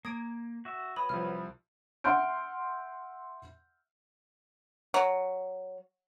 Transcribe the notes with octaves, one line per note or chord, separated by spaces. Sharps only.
A#3 D#6 G#6 D7
F#4 E5
F#3 B4 B5 D#6
C2 F3 F6
E5 F#5 C6 F6 G6 D7
F#3